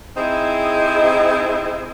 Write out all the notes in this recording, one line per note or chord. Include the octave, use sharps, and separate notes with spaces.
C4 D#4 E4 G#4 C5